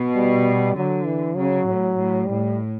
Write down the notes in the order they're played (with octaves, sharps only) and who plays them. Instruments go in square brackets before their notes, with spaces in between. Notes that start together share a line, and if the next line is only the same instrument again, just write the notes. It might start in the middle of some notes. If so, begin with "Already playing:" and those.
Already playing: [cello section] B2
[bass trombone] G3
[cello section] D3 [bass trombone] F#3
[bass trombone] E3
[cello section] C#3 [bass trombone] F#3
[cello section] A2
A2
[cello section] A2 [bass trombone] G3